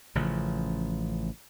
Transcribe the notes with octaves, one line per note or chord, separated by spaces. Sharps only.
A1 C#3 F3